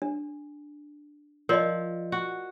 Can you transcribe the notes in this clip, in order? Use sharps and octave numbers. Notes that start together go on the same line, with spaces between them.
D4
F3 A#4 D5 D#5
F#4